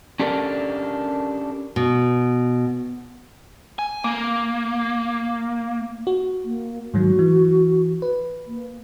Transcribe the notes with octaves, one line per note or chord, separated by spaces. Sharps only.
C#4 D4 G4 A4 A#4 D5
B2
G#5
A#3
F#4
A#3
G#2 D#3 F#3 F#4
E3
B4
A#3